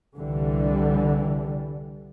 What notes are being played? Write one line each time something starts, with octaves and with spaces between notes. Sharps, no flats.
C2 D3 E3 G3